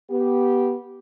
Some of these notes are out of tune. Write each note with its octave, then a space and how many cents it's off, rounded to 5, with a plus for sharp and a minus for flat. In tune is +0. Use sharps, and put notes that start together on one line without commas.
B3 -15 G4 -10